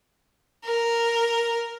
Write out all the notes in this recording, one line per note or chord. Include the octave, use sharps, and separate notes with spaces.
A#4